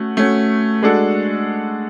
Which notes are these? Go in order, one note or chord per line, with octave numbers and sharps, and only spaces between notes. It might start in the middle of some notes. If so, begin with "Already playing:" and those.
Already playing: A3 C#4 F#4
A3 C#4 F#4
G#3 D4 F#4 A4